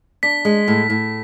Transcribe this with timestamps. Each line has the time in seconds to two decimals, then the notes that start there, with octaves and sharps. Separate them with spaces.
0.23 D4 B6
0.45 G#3
0.68 A2
0.90 A2